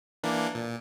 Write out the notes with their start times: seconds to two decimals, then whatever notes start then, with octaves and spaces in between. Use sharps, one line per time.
0.23 E3 A#3 D4
0.55 A#2